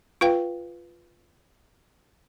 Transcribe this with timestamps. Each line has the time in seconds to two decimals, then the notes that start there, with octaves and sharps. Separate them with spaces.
0.21 F4 B4 F5 G5